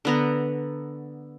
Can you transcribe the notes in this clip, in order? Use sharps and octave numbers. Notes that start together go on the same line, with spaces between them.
D3 B3 A#5